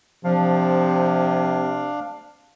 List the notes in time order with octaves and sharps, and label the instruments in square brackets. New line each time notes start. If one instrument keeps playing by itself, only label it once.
[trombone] C3 [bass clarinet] F3 [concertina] D4 F5